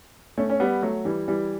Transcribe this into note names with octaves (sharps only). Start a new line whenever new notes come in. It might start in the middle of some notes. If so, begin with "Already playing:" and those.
A3 C#4
C#4
G3 B3
F#3 A3
E3 G3
E3 G3